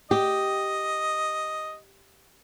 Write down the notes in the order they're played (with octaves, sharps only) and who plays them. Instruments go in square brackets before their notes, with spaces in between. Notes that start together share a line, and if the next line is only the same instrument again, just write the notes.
[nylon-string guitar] G4 [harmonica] D#5